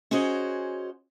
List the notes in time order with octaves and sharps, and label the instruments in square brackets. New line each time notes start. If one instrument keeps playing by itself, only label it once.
[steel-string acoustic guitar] C#4 F#4 G#4 C5 C#5 D#5